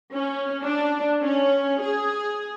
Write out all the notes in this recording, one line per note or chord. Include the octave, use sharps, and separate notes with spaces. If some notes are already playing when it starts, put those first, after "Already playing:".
C#4
D4
C#4
G#4